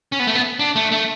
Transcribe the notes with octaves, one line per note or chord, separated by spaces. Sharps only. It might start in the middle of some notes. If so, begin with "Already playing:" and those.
C#4
B3
A3
B3
D4
A3
A3